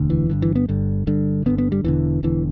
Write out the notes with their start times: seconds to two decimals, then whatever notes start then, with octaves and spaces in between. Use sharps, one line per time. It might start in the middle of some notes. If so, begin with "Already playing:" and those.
Already playing: E1 D2 D3
0.10 E3
0.30 G1 G2 D3
0.42 E3
0.55 B3
0.69 G1 G2 D3
1.07 G1 G2 D3
1.46 G1 G2 D3 B3
1.58 B3
1.72 G3
1.84 E1 E2 D3 E3
2.23 E1 E2 D3 E3